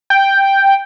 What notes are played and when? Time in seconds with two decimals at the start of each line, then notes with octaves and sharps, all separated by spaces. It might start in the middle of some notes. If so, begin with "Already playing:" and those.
0.10 G5